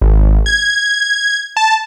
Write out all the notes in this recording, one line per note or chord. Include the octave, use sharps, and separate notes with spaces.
G#1
G#6
A5